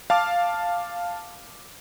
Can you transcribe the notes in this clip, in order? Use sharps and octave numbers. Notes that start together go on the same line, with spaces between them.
F5 A5 D6 F6